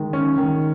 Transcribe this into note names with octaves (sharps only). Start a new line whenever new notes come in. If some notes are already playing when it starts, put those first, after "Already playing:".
Already playing: D#3 G#3
C#4
D#3